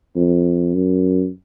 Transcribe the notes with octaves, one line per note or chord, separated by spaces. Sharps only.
F2
F#2